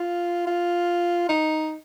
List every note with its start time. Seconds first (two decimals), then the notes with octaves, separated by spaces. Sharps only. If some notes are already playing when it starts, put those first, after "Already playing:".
Already playing: F4
0.47 F4
1.29 D#4